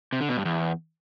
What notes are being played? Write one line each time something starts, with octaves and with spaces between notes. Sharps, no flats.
C3
D3
B2
G2
E2